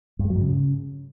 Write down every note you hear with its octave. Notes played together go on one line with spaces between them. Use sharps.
G2
G#3
F#3
G#2
C#3